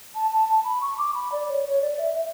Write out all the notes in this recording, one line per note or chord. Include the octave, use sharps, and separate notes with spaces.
A5
A5
A5
B5
C#6
D6
B5
D5
C#5
C#5
D5
E5
E5